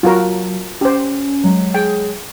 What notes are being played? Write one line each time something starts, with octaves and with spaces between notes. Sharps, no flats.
F#3 F4 F#4 A#4 A5
C#4 G4 C5
F#3 G#3
G#4 G5